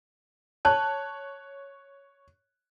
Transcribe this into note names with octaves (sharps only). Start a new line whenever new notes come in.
C#5 A5 F#6